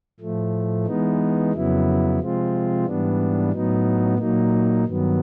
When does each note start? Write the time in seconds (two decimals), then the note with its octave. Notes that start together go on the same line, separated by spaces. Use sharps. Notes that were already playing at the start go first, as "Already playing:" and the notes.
0.20 A2 F3 A3
0.86 E3 G#3 B3 D#4
1.53 F2 C#3 F#3 B3 E4
2.19 C3 F3 G#3 C4 F4
2.85 G#2 E3 G3 B3 D4
3.52 A2 F#3 B3 D#4
4.18 A#2 F#3 A#3 D#4
4.84 G2 D#3 F#3 B3